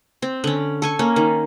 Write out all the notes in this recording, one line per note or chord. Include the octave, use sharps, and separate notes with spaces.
C4
D3 C#4
A4 G#5 C#6
A#3 C#4
D#3